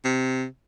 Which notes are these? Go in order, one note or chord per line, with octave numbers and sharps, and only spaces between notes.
C3